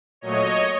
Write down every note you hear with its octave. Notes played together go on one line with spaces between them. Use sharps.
A#2 F#3 A3 C#5 D#5